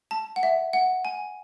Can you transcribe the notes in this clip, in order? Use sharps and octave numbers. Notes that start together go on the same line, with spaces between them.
A5
F#5
E5
F#5
G#5